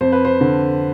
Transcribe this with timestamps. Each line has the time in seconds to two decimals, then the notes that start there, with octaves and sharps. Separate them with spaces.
0.01 F2 C5
0.12 B4
0.25 C5
0.41 D3